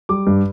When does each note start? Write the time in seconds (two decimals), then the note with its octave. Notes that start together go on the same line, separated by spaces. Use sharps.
0.09 G3 D6
0.27 G2